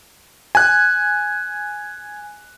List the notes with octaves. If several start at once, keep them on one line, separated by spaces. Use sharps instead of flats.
G#5 F#6